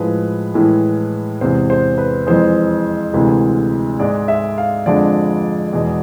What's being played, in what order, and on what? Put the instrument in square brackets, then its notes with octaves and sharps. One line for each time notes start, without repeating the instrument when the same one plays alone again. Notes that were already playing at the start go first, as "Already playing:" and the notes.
Already playing: [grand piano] A2 F3 G#3 B4
A2 E3 G#3
E2 C3 E3 G#3 C5
C5
B4
F2 E3 G#3 C5
D2 C3 E3 G#3
G#2 G#3 D5
E5
F5
F2 D3 F3 G#3 D5
E2 B2 G#3